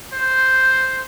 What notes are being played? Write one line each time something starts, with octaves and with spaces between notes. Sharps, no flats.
C5